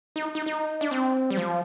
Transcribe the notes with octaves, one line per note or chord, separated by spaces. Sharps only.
D#4
D#4
D#4
D4
C4
G3
F3